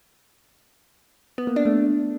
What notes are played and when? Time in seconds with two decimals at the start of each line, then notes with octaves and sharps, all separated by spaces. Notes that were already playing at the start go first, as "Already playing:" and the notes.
1.38 B3
1.47 A#3
1.56 D4
1.65 A3